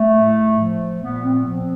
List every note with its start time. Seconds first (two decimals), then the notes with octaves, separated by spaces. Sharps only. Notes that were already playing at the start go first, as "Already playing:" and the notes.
Already playing: A3
0.13 A2
0.59 F3
1.02 A#2 B3
1.24 C4
1.47 F3